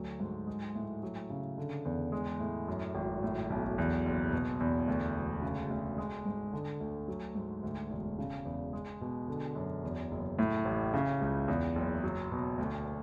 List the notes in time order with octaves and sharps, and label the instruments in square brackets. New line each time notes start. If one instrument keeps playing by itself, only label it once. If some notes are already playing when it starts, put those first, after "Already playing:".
Already playing: [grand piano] D2 F#3
G#2
G#3
A2
F#3
C#3
D3
E2
G#3
A2
F#2
G#1
A2
B1
E2
F#1
B2
E2
D2
E1
C#3
D2
G#3
G#2
D3
D2
F#3
G#2
D2
E1
C#3
E2
G#3
B2
D3
F#2
E2
F#1
A2
A1
C#3
C#2
E2
F#1
F#3
B2
D2